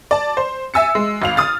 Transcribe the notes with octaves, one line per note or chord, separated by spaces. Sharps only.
D5 A5
C5
E5 G#5 E6 A6 C#7
G#3
G#1 F5 F7
D#6 F6 A6